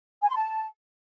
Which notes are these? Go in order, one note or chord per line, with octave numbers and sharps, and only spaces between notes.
G#5
C6
A5